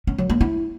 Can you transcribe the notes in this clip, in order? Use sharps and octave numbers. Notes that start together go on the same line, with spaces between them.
C#4
F#3
A#3
E4